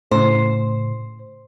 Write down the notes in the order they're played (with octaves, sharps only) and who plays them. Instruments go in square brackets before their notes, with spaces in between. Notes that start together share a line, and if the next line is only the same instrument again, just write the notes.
[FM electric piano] A2 C#3 [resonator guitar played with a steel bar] C5